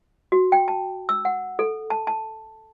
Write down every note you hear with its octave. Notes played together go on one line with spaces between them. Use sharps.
F#4
G5
A5
E6
F#5
A4
A5
A5